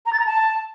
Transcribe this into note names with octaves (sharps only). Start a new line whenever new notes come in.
A#5
A6
A#5
A5